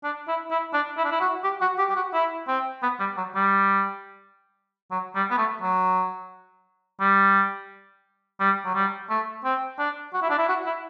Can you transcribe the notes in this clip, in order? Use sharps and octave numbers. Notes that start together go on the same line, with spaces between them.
D4
E4
E4
D4
E4
D4
E4
F#4
G4
F#4
G4
G4
F#4
E4
C4
B3
G3
F#3
G3
F#3
G3
B3
A3
F#3
G3
G3
F#3
G3
A3
C4
D4
F#4
E4
D4
E4
F#4
E4